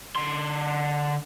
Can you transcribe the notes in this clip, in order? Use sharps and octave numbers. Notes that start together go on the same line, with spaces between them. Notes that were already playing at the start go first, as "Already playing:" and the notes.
D3 C6